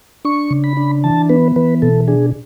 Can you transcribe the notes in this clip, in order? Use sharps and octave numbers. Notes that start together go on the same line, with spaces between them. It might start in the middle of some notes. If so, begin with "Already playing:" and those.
D4 C#6
C#3
B5
D4
E3 A5
B3 B4
E3 B4
B2 A4
D4 G#4